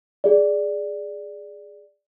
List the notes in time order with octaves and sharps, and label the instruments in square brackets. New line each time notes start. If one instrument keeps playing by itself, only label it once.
[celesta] G#4 D5